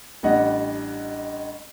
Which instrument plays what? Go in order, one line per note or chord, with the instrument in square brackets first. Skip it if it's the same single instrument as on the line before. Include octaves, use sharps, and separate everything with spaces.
[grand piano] A1 G3 D4 D#5 F#5